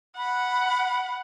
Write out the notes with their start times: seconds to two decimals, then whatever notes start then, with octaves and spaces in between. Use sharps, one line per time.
0.18 F#5 B5